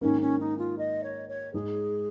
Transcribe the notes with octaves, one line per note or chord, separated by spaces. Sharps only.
G#2 D#3 A#3 C#4
C#4
D#4
F4
D#5
C#5
C#5
G#2 G#3 D#4 G#4